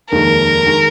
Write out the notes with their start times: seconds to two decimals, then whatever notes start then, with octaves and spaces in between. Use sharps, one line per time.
0.11 F1 D#2 D#3 G#3 A#4
0.66 D#3 G#3